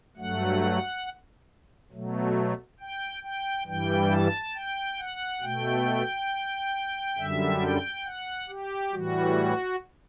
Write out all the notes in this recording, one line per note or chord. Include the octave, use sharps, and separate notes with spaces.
G2 F#3 A3 F#5
B2 F#3 A3
G5
G5
G2 E3 G3 G5
A5
G5
F#5
B2 A3 G5
F#2 D3 G3 E5
G5
F#5
G4
A2 E3 G3 F#4